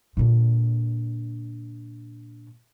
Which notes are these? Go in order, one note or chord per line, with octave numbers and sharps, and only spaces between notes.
A#2 D3